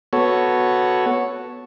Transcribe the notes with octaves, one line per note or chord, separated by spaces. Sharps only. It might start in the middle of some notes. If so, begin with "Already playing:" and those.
B3 F#4 A4 C#5